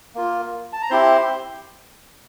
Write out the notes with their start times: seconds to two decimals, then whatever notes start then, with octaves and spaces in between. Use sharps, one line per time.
0.15 A#3 F4
0.73 A5
0.82 A#5
0.90 C4 E4 G4 C5 C6